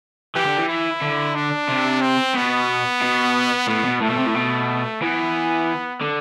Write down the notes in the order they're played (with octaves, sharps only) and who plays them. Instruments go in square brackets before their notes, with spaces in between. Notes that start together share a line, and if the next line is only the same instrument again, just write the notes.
[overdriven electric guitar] E3 [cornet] G4
[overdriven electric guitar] D3
E3
[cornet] E4
[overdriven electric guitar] D3
[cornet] D4
[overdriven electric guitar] C3
[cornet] C4
[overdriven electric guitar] B2 [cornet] B3
[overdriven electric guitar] B2
[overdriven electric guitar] A2 [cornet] B3
[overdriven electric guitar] B2
[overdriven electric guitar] A2 [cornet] A3
[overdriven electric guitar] B2
C3
A2
B2
[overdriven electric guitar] E3 [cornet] B3
[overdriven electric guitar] D3